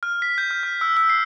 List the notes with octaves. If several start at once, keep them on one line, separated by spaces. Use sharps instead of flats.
F6
B6
G6
F6
F6
E6
E6
C7